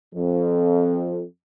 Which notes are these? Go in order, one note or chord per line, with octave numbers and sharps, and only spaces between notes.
F2